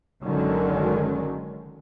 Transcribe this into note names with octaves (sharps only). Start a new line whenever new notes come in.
F#1 D3 D#3 F#3 G#3 C#4